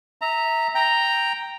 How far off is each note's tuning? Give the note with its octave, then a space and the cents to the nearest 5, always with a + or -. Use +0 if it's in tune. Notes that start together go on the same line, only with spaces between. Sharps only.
E5 -25 A#5 -10
G5 +0 A#5 +0